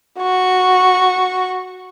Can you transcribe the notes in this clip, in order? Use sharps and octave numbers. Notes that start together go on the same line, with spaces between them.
F#4 C#6